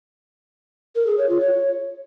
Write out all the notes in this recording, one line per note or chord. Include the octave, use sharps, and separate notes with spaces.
A#4
G#4
C#5
F4
C#5